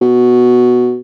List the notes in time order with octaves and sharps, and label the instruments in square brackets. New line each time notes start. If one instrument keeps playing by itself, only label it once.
[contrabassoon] B2